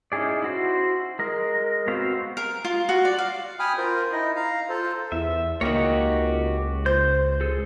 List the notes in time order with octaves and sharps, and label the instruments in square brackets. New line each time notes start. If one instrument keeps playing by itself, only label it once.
[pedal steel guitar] C#4 D#4 E4 G#4 D5
E4 F#4 C5
G#3 A#4
B3 C4 F#4 C5 F5
[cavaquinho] A#4
F4
F#4
D5
F5
[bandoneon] G5 G#5 B5 D#6 F6
F4 A#4 C5
D#4 E4 D#5
F5 A#5
F4 A4 C5
[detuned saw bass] E2 [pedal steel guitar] E5
[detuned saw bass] C#2 [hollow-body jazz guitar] A#3 D#4 [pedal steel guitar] F#4 G4 C#5
[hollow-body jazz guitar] C5 [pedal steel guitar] G6
[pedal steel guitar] G#4 A4